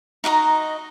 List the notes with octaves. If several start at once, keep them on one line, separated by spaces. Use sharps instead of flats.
D#4 F#4 D#5 A#5